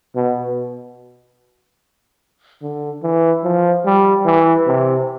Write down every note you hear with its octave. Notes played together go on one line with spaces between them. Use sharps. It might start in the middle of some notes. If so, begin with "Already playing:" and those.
B2
D3
E3
F3
G3
E3
C3